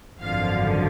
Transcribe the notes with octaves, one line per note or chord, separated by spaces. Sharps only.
G#1 F#2 D3 F3 F5